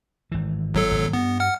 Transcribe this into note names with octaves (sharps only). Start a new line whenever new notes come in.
G#1 E3
G1 F#3 A4
G#1 B2
G2 B3
F#5 F6